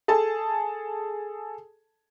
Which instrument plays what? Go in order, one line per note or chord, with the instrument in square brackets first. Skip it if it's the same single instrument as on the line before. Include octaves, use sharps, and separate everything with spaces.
[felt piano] G#4 A4 A5